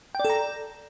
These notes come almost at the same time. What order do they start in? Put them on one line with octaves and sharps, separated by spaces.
G5 D5 A4 A#5